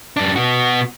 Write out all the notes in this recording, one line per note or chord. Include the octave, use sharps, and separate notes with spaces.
F#2 D4
B2 F#4